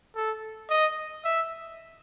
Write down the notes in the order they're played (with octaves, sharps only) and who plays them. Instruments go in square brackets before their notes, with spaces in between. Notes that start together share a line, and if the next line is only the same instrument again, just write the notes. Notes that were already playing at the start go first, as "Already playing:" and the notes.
[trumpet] A4
D#5
E5